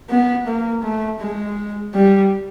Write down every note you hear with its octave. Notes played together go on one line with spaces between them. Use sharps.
B3
A#3
A3
G#3
G3